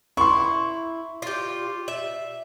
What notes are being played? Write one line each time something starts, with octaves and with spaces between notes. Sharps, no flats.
E4 C6 C#6
F4 G4
E5